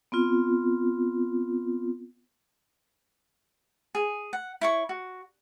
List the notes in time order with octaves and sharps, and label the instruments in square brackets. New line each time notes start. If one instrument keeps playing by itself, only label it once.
[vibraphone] B3 C4 F4
[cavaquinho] G#4
F#5
E4 C#5 C#6
F#4